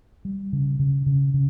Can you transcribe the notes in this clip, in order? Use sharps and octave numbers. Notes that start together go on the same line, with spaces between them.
G3
C#3
C#3
C#3
C#3